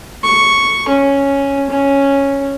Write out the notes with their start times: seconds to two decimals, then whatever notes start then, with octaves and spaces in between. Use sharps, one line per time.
0.24 C#6
0.89 C#4
1.70 C#4